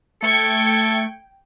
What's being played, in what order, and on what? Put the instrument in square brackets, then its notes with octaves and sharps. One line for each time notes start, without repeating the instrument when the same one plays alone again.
[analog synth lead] A3 [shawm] A4 [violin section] G5 G#6 C#7